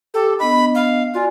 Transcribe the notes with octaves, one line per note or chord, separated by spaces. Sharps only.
G4 A4 G5 D6
B3 D4 D#5 B5
F5
F4 F#4 D5 G#5